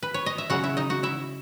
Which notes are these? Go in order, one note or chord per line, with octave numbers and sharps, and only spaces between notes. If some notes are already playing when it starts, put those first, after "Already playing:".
B4
C#5
D#5
E5
C#3 F#3 F#4 F#5
E4 E5
D#4 D#5
F#4 F#5
E4 E5